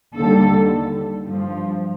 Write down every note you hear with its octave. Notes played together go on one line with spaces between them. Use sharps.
D#2 D3 G3 A4
G2 F3